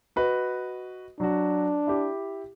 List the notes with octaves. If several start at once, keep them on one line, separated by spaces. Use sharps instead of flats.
F#4 B4 D#5
F#3 D4 F#4
E4 G4